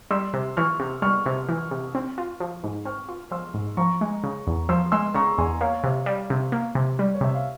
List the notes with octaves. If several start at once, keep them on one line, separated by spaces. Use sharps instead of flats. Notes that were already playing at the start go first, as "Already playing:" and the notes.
G3 C6 E6
C3
E3 C#6 F6
C3
G3 C#6 F6
C3
E3
C3
C4
F4
F3
G#2
C4 C#6 F6
F4
F3 C6 E6
G#2
F3 A#5 C#6
G#3
C#3
E2
F3 C6 E6
G#3 C6 E6
C#3 A#5 C#6
E2 G#5 C6
A#3 C#5 F5
C3
G3
C3
A#3
C3
G3
C#5
C3 E5
F5